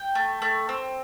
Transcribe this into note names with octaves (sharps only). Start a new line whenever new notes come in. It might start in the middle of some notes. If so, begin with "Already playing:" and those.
Already playing: G5
A3
A3
C4